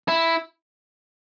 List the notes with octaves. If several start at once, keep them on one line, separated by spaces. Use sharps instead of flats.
E4